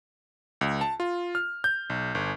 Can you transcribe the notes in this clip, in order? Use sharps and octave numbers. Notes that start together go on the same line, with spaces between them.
C#2
A5
F4
F6
G6
B1
G1